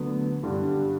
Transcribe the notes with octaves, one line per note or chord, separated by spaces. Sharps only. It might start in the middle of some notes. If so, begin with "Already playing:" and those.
Already playing: D2 D3 F#3 B3
G2 D3 G3 D4